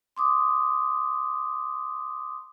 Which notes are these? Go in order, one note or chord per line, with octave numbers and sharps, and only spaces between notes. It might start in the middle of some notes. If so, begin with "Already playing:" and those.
C6 D6 D#6